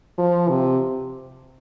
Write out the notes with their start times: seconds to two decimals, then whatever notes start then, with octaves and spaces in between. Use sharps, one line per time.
0.18 F3
0.49 C3